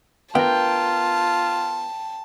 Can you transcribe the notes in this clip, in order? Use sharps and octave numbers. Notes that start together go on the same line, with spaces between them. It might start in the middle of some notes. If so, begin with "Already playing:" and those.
B3 F4 A#4 G5 A5